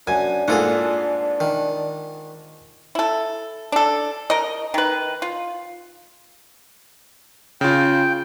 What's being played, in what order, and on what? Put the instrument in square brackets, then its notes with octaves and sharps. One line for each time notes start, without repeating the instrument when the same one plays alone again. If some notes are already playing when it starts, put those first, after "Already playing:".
[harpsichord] F#2 [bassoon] D4 [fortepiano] G#5
[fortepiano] G#2 A#3 F4 [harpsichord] G#4 A4 F#5
[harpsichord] D#3
[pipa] E4 A4
D4 A4
A#4 D#5
D#3 B4
F4
[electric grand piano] C#3 F4 [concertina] G5